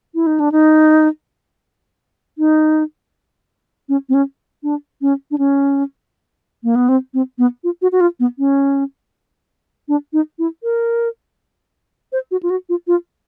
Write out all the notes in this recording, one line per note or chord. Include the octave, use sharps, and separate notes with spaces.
E4
D#4
D4
D#4
D#4
C#4
C4
C#4
D4
C#4
D4
C#4
A#3
B3
C4
C4
B3
F4
F#4
F#4
F4
B3
C#4
D4
D#4
E4
A#4
C5
F#4
F4
F#4
F4
F4